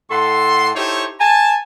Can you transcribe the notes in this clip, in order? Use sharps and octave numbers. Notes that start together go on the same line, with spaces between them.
A2 A4 F#5 C6
D#4 E4 G4 A4 C5 C#5
G#5 A5